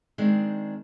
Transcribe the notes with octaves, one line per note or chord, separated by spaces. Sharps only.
D#3 G#3 C4 D4